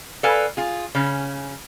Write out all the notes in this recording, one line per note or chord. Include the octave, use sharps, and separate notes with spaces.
A4 B4 D5 F5 G#5
F4 G#4
C#3 C#4